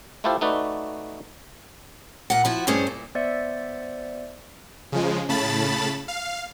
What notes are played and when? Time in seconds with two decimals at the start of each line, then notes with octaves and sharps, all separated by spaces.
0.24 A3 E4 F4 G4 A4 C5
0.41 A3 D#4 F#4 B4 D5
2.30 A#2 F#5
2.45 F3 E4 F#4
2.67 G2 A3 C#4 G#4 C5
2.87 A#2
3.15 B3 C5 D5 E5 E6 C#7
4.92 C#3 F3 G#3
5.29 A2 C#3 A5 B5 A6
6.08 F5